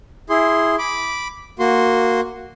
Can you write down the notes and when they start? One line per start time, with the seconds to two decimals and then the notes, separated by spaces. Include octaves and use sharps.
0.30 E4 G#4 C6
0.79 B5 D6
1.59 A#3 F#4 C6